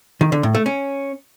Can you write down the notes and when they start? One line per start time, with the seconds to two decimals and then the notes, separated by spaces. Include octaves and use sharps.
0.21 D#3
0.32 D3
0.43 A2
0.55 A3
0.66 C#4